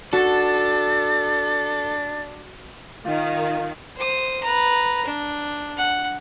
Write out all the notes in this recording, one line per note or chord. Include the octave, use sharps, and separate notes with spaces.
D4 F#4 A4 A6
D#3 F4
C5 D#6
B4 A#5
D4
F#5